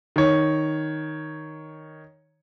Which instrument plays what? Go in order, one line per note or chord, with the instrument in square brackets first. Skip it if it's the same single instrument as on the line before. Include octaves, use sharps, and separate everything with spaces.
[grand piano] D#3 C#5